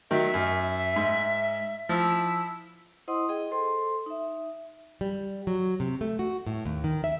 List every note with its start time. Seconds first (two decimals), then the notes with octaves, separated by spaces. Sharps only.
0.11 D#3 F#3 E5
0.34 F#2
0.96 G#2
1.89 F3 E4
3.08 E4 C5 D#5 F#5 C6 D#6
3.29 G#4 D#5 G5
3.51 A4 C5 C6
4.06 D#4 E5
5.01 G3
5.47 F#3
5.80 C3
6.01 A3
6.19 F#4
6.47 A2
6.66 D#2
6.84 D#3
7.04 E5